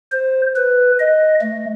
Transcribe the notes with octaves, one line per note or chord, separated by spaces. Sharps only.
C5
B4
D#5
A3